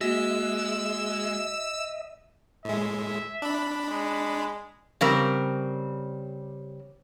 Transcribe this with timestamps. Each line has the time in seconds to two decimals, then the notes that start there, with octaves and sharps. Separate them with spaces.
0.01 G#3 A#3 F#4 D#5 E5 E6
2.65 A2 G#3 E5
3.42 D4 B5
3.89 G#3
5.01 C#3 G3 C4 A#4